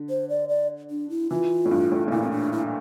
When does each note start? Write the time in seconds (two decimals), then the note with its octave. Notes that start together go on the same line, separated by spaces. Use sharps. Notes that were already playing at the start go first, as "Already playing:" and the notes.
Already playing: D3
0.10 C5
0.29 D5
0.49 D5
0.90 D4
1.10 E4
1.30 E3 F4
1.65 A2
1.71 G2
1.92 A2
2.08 A2
2.12 A#2 E4
2.23 C4
2.31 D4
2.52 E4